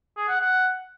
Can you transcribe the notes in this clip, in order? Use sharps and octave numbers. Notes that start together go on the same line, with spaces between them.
G#4
F#5
F#5